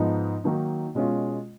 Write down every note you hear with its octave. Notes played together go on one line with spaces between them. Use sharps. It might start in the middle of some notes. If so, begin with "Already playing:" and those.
Already playing: G#2 F3 B3 D#4
D#3 F#3 A#3 D#4
B2 G#3 C#4 F4